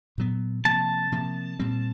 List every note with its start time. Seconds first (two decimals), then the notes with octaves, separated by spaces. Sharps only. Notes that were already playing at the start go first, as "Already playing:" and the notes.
0.18 A#2 F#3 B3
0.65 C3 F3 A#3 A5
1.12 C3 F3 A#3
1.59 A#2 G3 C4